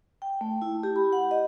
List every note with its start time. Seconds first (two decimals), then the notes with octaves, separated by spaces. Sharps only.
0.22 G5
0.41 A3
0.62 E4
0.83 G4
0.96 B5
1.13 F#5
1.31 D#5